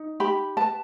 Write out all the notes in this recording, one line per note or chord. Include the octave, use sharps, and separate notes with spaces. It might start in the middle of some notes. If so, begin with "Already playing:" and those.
Already playing: D#4
G4 B5
B4 A5